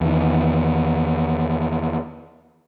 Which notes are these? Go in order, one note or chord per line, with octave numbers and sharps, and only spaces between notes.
E2 D#3